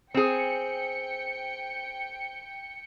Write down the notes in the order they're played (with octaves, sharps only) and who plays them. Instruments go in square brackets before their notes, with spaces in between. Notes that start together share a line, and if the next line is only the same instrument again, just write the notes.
[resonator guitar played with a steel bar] C4 G#4 [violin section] G5 C#7